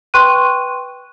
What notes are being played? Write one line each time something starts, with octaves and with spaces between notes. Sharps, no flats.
B4 G5 C6 C#6 F#6 D#7